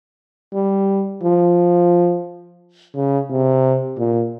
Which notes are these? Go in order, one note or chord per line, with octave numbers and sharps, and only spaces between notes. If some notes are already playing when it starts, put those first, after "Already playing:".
G3
F3
C#3
C3
A#2